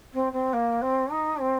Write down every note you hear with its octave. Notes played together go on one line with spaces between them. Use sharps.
C4
C4
A#3
C4
D#4
C4